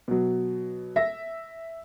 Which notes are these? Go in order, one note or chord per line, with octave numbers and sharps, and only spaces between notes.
B2 F#3
E5 A#6